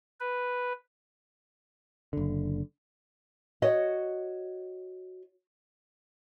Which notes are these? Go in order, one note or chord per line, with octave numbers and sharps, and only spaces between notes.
B4
F#1 D3
F#4 C#5 D#5